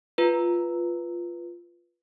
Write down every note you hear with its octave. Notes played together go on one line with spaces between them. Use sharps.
F4 B4